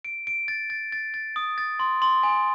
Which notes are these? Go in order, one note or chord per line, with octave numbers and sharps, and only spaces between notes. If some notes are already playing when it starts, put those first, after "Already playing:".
D7
D7
A6
A6
A6
A6
D#6
A6
C6
C6
G#5